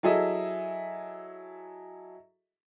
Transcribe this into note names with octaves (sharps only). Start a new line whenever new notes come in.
F#3 E4 G#4 A4 D#5 E5